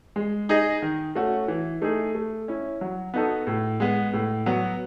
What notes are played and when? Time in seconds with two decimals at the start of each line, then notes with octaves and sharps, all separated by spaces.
0.16 G#3
0.49 D#4 G#4 D#5
0.82 D#3
1.15 A3 C#4 F#4
1.48 E3
1.82 A3 D#4 G#4
2.15 A3
2.48 C#4 E4
2.81 F#3
3.14 B3 D#4 F#4 A4
3.47 A2
3.80 G#3 B3
4.13 A2
4.46 F#3 B3